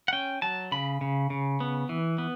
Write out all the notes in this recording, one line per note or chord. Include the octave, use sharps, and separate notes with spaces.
F#5
C#4 G5
F#3 A5
C#3 B5
C#3
C#3
B3
E3
B3